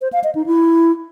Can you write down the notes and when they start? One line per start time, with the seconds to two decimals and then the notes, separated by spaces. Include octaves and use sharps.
0.01 C5
0.13 F5
0.24 D#5
0.35 D#4
0.46 E4